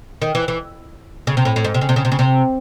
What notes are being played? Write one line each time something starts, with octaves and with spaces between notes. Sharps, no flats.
D#3
E3
E3
C#3
C3
A2
A2
G#2
C3
C#3
C3
C#3
C3
C#3
C3